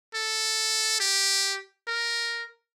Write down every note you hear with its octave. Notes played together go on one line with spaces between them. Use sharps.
A4
G4
A#4